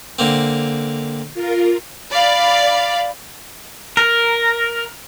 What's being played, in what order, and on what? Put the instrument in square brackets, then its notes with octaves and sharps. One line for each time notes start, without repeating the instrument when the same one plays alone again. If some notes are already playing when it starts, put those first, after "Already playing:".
[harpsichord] D3 A#3 C4
[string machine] F4 A#4
[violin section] D5 F5 B5
[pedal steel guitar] A#4